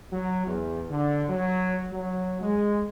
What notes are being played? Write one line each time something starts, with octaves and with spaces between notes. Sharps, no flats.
F#3
E2
D3
F#3
F#3
G#3